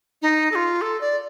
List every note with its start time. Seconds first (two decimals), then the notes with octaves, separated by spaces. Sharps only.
0.22 D#4
0.52 A4
0.55 F4
0.82 A4
1.01 D5